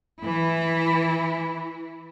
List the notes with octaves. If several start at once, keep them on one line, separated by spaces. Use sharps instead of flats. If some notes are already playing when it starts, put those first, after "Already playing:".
E3 E4